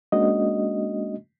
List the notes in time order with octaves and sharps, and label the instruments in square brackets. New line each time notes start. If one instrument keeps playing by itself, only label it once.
[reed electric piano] G#3 A#3 C#4 D4 F#4 D#5